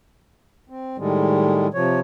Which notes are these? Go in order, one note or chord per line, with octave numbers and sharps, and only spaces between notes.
C4
A2 D#3 G3 G#3
C3 F3 C#5